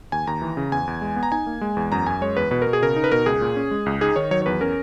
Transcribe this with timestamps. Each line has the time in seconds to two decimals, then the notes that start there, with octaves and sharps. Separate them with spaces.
0.12 D#2 G#5
0.27 D#2 A#5
0.42 E3
0.57 C#3
0.72 E2 G#5
0.87 E2
1.02 G#3
1.16 B3
1.23 A#5
1.32 D#4 G#5
1.47 A#3
1.61 G#3
1.77 E2
1.92 F#2 A#5
2.06 F#2 G#5
2.21 G#3 C#5
2.36 E2 B4
2.51 B2 B4
2.62 A#4
2.67 B2
2.73 G#4
2.82 C#3 A#4
2.96 D#4
3.04 B4
3.12 B2 A#4
3.26 C#2 G#4
3.41 A#2
3.56 C#4
3.71 G#3
3.86 C#2
4.01 D#4 G#4
4.16 D#3 C#5
4.31 F#3 C#5
4.42 C#5
4.46 E2 B4
4.61 C#4 A#4